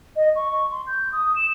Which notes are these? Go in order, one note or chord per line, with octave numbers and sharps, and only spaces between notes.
D#5
C#6
C6
G6
D#6
E7